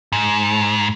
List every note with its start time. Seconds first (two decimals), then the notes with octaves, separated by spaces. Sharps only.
0.12 G#2